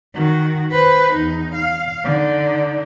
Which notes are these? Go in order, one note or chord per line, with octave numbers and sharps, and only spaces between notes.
D#3 F#4
B4 C5
E2 D#4
F5
D3 D#4